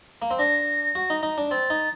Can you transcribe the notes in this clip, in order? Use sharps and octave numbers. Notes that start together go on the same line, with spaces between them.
A#3
C4
D4 A#6
F#4
D#4
D#4
D4
C4 A6
D#4